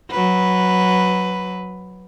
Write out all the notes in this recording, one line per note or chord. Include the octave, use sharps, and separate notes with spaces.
F#3 B4